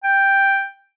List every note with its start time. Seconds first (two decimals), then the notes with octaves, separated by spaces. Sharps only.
0.04 G5